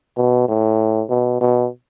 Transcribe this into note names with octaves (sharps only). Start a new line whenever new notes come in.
B2
A2
B2
B2